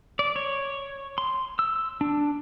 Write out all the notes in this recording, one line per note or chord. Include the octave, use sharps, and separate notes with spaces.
D5
C#5
C6
E6
D4